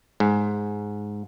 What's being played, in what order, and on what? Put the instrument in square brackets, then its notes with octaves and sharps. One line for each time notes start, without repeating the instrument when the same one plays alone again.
[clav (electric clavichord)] G#2